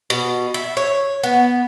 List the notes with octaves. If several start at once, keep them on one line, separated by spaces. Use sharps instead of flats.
B2
E5
C#5
B3